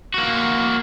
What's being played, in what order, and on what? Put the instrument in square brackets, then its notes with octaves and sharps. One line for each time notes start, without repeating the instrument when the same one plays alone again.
[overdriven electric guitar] A#3 F#4